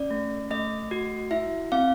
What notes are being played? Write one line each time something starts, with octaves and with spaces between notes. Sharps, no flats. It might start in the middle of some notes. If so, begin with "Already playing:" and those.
Already playing: C#4 D5
A3
A3 D#5
F#4
E4 E5
C4 F5